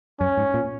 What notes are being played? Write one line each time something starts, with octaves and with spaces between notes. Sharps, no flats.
F#2 C#4
G#2
A#2